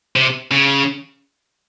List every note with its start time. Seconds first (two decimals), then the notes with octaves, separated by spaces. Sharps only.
0.16 C3
0.51 C#3